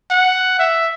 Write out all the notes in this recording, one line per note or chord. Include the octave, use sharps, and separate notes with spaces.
F#5
E5